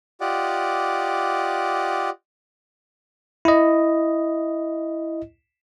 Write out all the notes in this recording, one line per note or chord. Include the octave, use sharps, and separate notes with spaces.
F4 G4 D5 D#5 F#5
E4 D#5